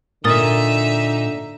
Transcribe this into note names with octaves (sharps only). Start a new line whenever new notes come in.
A#2 D3 D#4 A#4 E5 D#6 A6